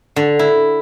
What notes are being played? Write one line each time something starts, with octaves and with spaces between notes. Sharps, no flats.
D3
E4